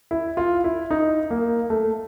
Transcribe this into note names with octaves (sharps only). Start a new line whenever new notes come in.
E4
F4
E4
D#4
A#3
A3